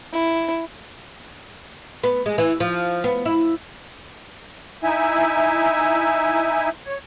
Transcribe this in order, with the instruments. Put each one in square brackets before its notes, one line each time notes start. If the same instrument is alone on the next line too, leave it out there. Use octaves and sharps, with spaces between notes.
[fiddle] E4
[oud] B3
G#3
E3
F3
B3
E4
[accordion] D#4 E4 E5 G#5
C#5